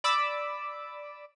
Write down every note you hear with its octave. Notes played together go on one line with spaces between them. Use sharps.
D5 B5 D6 E6